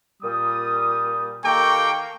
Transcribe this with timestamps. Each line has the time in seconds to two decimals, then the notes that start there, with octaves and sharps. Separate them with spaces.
0.23 A#2 G3 D#6
1.45 D#3 A#3 G4 A4 G5 A#5 C#6